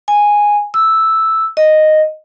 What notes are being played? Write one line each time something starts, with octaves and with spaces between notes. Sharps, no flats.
G#5
E6
D#5